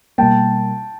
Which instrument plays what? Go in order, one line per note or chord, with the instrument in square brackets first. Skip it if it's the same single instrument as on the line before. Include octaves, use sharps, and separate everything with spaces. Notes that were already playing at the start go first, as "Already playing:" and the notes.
[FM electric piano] B2 G3 A#3 [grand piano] G5 A5